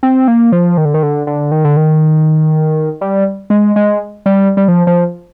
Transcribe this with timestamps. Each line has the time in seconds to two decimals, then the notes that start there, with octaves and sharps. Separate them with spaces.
0.03 C4
0.28 A#3
0.52 F3
0.77 D#3
0.85 D3
0.94 D#3
1.03 D3
1.27 D3
1.52 D#3
1.64 D3
1.77 D#3
3.01 G3
3.50 G#3
3.76 G#3
4.26 G3
4.57 G3
4.68 F3
4.87 F3